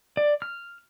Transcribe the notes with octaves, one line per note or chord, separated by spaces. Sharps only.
D5
F6